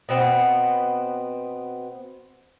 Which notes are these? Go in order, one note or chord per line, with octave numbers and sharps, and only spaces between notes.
B2 B3 C4